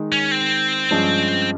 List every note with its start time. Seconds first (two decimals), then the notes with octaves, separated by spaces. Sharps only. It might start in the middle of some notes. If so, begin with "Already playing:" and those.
Already playing: D#3 G#3 D#4
0.12 C#4
0.31 C4
0.90 G2 F3 G#3 C#4